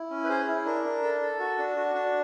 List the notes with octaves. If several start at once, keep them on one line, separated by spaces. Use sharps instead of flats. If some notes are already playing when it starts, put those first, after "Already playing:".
Already playing: E4
C#4
B4
G#4 C5
E4
D4 A#4
D4
A4
A4
F#4
D4
F#4
D4